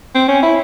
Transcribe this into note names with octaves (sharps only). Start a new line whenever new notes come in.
C4
C#4
E4